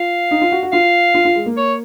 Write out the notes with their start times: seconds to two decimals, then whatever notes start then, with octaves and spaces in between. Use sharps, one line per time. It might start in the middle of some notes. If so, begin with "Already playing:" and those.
Already playing: F4 F5
0.31 D#4
0.41 F4
0.52 F#4
0.63 F#4
0.72 F4 F5
1.15 F4
1.25 F4
1.36 G#3
1.46 A#3
1.57 C#5